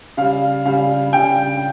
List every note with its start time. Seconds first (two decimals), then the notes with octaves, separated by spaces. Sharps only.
0.17 C#3 G3 F5
0.65 C#3 G3 F5
1.12 C#3 G3 G5